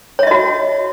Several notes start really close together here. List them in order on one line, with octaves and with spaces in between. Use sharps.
C#5 E5 D#5 F#4